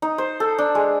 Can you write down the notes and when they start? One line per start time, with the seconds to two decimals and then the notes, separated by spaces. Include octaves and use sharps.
0.02 D#4
0.18 C5
0.40 A4
0.58 D4
0.75 G#3